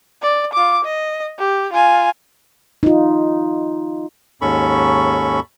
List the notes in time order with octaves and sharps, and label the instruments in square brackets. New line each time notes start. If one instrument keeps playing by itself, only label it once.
[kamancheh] D5
F4 D6
D#5
G4
F4 G#5
[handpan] D#4 F4
[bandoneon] D#2 G#2 C#4 A4 B5 C#6